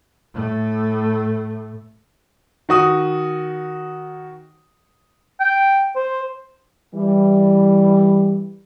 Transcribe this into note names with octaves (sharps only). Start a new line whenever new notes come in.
A2 A3
D#3 F#4 D#6
G5
C5
E3 G3